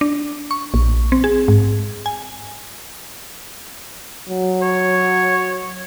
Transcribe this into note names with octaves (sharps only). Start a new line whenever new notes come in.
D4
C#6
A#1
C4
G#4
G#2
G#5
F#3
C#5